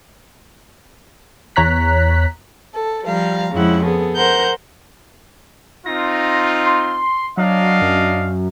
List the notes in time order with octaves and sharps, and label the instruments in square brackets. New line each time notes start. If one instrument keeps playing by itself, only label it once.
[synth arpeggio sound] E2 C#5 A#5 F#6 B6
[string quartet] A4
F3 G3 F5 A#5
F2 C#3 F3 G#3 E4 F#5
B3 G#4 A4
A#4 C5 F#5 A#5 G6
[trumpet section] C4 D#4 F4 [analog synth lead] A#6
[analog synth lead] C6
[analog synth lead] F#3 [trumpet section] D4 D#5 F5
[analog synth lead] F#2